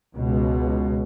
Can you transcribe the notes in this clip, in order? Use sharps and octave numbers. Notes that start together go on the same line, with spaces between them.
C#2 B2